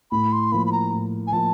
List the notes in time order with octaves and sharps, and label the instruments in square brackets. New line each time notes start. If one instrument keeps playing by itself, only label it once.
[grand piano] A2 [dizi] B5
[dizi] C6
[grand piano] F3 A#3 [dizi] B5
[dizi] B5
A#5
[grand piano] A2
[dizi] G#5
[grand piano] F3 A#3 [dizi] A5